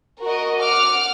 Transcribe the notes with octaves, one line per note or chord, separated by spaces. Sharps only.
F#4 A#4 D#5
F#5 D6 F6